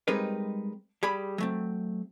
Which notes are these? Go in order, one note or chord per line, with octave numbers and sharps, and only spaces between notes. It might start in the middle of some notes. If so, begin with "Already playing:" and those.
G3 G#3 C4 D#4 A#4 B4
G3 G#4 B5
F#3 A3 C4